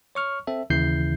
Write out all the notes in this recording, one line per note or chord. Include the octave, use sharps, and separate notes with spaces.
C#5 C#6 F6
C4 A4 E5
D#2 C#3 E3 E4 G6 C7